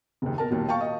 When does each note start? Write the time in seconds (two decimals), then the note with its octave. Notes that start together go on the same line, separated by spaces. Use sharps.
0.22 F#1 D#2
0.38 B2 A#4 A5
0.51 D#2 A#2 F#3
0.69 F5 G5 A5 C#6
0.81 D#5